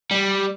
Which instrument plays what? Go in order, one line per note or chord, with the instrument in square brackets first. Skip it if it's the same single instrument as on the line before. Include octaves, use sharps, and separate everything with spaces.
[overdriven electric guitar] G3